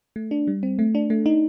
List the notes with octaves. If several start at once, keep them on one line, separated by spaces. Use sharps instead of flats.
A3
D4
G3
C4
A3
D4
A3
D#4